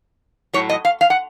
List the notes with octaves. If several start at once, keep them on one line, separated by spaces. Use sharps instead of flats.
A2 F#3 C#5
D#5
F5
F5
F#5